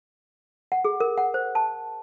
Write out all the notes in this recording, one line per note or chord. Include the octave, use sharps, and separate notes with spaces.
F#5
G#4
A#4
F#5
C5
A5